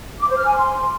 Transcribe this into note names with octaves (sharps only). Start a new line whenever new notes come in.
D6
C5
F6
G#5
C6